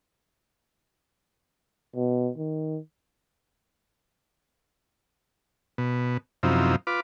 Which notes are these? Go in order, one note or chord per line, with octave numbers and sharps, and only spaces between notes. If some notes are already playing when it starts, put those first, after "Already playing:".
B2
D#3
B2
F#2 C3 F3 D#4 E4
F4 B4 D6